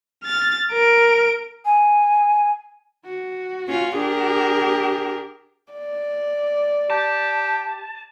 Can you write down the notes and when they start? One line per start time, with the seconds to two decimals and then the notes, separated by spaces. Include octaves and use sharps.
0.24 F6 A6
0.72 A#4 D7
1.65 G#5
3.05 F#4
3.68 C#4 F4
3.96 D4 G4 G#4 A#4
5.73 D5
6.90 G4 A5